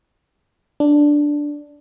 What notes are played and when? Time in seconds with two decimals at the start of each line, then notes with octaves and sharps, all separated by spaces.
0.80 D4